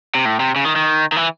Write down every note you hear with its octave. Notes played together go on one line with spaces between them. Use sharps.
C3
A2
C3
C#3
D#3
D#3
D#3
E3